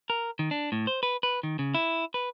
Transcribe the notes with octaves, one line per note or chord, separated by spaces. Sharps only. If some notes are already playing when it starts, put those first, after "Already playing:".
A#4
D#3
D4
A2
C5
B4
B4
D#3
C#3
E4
B4